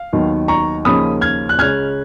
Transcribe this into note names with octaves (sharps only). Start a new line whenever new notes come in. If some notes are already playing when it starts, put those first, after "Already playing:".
Already playing: F5
D#2 D#3 F#3 B3
A#5 C#6
D#2 C#3 F3 A#3 C#4 B5 D#6
F6 G#6
F#6
C#2 C#3 G#3 C#4 F6 G#6